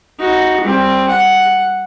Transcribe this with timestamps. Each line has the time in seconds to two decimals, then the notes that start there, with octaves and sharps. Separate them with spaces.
0.20 D#4 F#4
0.61 G3 C4
1.09 F#5